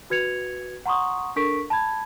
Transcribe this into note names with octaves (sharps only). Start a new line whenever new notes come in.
F#4 B4 G#6 C#7 F7
F#5 A#5 C6 C#6 D#6
D4 A4 A#4 C#6 B6 D7
A5 B5 G#6